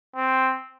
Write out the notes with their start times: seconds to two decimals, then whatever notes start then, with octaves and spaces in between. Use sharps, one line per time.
0.16 C4